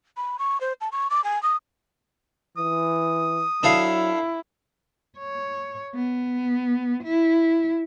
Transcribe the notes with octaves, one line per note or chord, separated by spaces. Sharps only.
B5
C#6
C5
A5
C#6
D6
G#5
D#6
E3 D#6
F#3 D4 E4 A4 F5
C#5
B3
E4